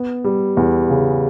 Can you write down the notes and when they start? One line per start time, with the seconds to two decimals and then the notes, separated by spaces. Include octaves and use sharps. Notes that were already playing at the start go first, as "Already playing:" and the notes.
Already playing: B3
0.24 G3
0.57 E2
0.90 C#3